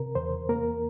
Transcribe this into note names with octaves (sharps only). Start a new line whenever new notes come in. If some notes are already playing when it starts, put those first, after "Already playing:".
Already playing: C3 A#4
E2 C5
A#3 A#4